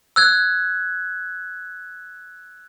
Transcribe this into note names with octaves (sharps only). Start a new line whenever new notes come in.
E6 F#6 G#6